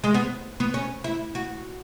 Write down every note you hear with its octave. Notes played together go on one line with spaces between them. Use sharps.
G#3
B3
B3
C#4
E4
F#4